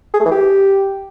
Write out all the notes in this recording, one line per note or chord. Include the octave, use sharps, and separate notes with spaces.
G#4
A3
E3
G4